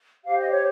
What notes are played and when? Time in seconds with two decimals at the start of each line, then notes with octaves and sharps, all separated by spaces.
0.25 G4 C5 F5
0.38 D#5
0.51 C#5